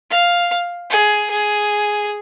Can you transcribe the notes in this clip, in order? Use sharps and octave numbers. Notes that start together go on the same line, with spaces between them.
F5
G#4
G#4